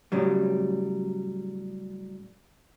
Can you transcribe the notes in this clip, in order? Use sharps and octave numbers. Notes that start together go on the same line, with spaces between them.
A2 C#3 F#3 G3